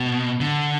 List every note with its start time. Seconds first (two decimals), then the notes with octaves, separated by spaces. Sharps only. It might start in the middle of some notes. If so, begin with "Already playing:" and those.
Already playing: B2
0.41 D3